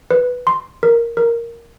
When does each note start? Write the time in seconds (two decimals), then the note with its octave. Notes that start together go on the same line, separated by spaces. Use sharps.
0.11 B4
0.47 C6
0.83 A#4
1.17 A#4